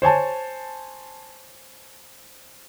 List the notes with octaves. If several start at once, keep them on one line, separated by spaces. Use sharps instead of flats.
C5 C#5 G#5 A5